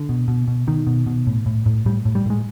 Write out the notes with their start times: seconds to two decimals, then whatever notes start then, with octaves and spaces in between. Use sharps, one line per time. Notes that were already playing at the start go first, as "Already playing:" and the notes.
Already playing: D3
0.09 B2
0.28 B2
0.48 B2
0.67 B2 D#3
0.87 B2
1.07 B2
1.27 A2
1.46 A2
1.66 A2
1.86 A2 G3
2.05 A2
2.15 G3
2.26 A2 G#3